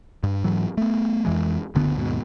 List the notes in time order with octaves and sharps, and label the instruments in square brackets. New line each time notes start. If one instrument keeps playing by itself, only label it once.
[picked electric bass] G2
G#2 E3 F#3
A3 B3
F2 E3 G#3
F#1 D2 D3 B3
D#2 G#2 B2